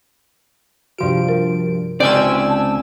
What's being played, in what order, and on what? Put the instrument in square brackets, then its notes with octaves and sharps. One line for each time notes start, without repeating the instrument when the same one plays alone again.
[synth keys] G2 F3 D7 [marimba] C3 F#4
[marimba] A#4
[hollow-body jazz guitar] C#2 D5 [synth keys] C4 G#5 E6
[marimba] A5